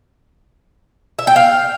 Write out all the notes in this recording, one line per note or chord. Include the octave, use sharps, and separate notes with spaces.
E5
G5
F5